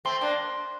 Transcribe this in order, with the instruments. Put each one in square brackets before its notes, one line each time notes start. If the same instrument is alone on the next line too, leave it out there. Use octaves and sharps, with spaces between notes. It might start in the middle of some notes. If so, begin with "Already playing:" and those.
[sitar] A3 C4 [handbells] C6
[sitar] A#3 D4